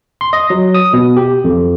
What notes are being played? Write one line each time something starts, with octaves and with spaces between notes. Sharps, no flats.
C6
D#5
F#3
D#6
B2
G4
F2